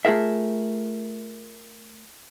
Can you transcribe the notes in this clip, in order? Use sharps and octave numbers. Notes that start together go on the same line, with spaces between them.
A3 F4 G#4 A#4 E5